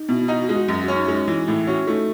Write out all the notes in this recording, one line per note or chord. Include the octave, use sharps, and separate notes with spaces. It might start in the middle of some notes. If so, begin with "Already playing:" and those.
Already playing: D#4
B2 E4
E4
D#4 F#4
F#4
G#3
F#4
F#2 F#4
F#4
C#4
D#4
G#3 D#4
E3
A2 E4
C#4 F#4
A3 D#4